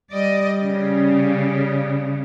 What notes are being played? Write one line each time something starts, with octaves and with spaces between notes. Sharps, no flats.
G3 D5 D#5
C#3